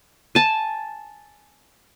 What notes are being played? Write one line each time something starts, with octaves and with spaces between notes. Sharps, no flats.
G#5 A5